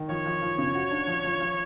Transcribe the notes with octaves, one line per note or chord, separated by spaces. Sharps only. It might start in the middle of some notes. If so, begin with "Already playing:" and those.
Already playing: D#3
F3 C#5
F3
F3
C#3
F#4
D4
F3
F3
F3